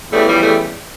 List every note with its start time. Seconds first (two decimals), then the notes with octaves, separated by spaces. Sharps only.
0.11 E2 C#3 E3 G3 A3
0.26 F3 G3
0.41 G3 A3